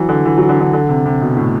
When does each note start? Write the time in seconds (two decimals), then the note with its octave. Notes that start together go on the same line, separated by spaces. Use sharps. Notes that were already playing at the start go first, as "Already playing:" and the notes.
Already playing: E3 F#3
0.09 D3
0.25 E3
0.38 F#3
0.49 D3
0.60 D3
0.73 D3
0.89 C3
1.05 C3
1.22 B2
1.37 A2